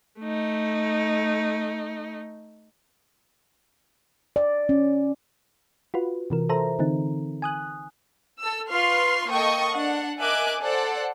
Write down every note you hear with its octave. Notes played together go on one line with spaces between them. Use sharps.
A3 D#4
D5
C#4
F4 F#4 B4
C3 E3 A#4
A4 C5 E5 A#5
D3 E3 C4 D#4
G#5 D#6 F#6
A4 E6
F4 B4 C6 C#6 F6 C7
A#3 A4 D#5 G5 C#6 D#6
D4 F#5
A#4 D#5 E5 G#5 D6 F#6
A4 C5 D5 F#5